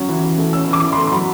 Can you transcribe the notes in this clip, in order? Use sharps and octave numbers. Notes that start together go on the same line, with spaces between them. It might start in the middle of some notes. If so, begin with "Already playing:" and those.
Already playing: F#3 C#4
E3
E3
A3
C#4 E6
E3
D6
E3
C6
A3
C6
F#3 B5